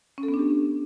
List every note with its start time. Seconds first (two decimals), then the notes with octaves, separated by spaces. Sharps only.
0.18 C#4
0.23 A4
0.28 B3
0.34 D4
0.39 G4